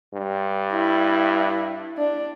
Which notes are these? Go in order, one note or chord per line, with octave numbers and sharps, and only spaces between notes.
G2
E4
D4